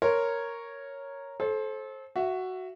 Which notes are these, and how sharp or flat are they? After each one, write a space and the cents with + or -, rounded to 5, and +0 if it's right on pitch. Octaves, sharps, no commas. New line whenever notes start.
A#4 +0 C#5 +0 C6 +0
A4 -25 C5 +25
F#4 +5 E5 +25